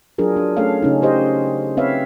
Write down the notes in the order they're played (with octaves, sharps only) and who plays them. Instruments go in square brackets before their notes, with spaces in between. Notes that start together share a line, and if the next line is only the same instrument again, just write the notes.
[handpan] F#3 D4 F4 G#4 A#4
D4
A3 C#4 A4 C#5 F5
C#3 C#4 D#4
G4 C5 D#5
C4 B4 C#5 E5 F5